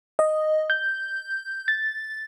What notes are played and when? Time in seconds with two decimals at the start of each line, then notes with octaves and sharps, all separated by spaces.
0.19 D#5
0.70 G6
1.68 A6